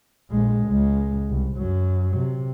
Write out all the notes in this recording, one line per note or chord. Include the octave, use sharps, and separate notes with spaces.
A#1 G#3
C#2 G#3
C2
F#2 F#3
C3